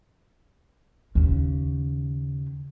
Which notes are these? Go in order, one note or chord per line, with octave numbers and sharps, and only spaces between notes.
D#2 C#3